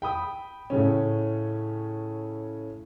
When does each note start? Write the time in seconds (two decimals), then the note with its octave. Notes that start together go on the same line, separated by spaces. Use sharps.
0.02 G5 B5 D#6
0.70 A2 C#3 C#4